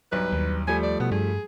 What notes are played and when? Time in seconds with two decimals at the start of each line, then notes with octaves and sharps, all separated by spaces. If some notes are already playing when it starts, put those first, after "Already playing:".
0.12 B1 G2 B4
0.32 D#2
0.67 F3 G3 A3 G#5
0.83 D5
1.00 B2 B3
1.12 G2 G#4